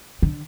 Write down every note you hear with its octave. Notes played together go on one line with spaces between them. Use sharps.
D3